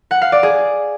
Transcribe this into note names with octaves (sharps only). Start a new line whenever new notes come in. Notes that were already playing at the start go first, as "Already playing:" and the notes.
F#5
F5
D5
G#4